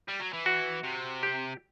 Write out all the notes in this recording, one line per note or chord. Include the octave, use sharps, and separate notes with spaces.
G3
F#3
E3
F#4
C3
G4